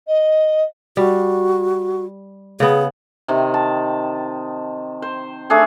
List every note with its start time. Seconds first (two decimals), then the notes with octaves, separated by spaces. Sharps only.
0.07 D#5
0.97 G3 F#4
2.60 C#3 B3 G#4
3.28 C3 D#3
3.54 A5
5.02 C5
5.50 A3 D4 G#4 A4